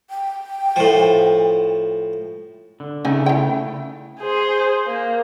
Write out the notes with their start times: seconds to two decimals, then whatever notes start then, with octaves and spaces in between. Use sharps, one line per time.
0.10 G5
0.76 A2 F3
2.80 D3
3.05 C#3 A3 D#4 G#5
3.26 E4 G5
4.20 G#4 C5
4.87 A#3